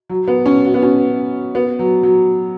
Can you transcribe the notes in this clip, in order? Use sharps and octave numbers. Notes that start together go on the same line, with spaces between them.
F#3
B3
C#4
F#4
B3
C#4
B3
F#3
F#3